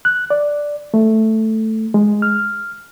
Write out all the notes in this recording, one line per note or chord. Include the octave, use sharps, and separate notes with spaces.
F#6
D5
A3
G#3
F6